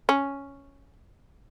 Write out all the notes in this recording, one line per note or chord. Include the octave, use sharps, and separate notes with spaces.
C#4